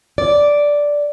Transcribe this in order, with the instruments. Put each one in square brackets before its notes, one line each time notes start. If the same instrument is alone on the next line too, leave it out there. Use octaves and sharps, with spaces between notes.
[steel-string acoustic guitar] D5